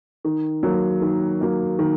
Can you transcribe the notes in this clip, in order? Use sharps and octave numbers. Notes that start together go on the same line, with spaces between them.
D#3
F#3 A#3
D#3
F#3 A#3
D#3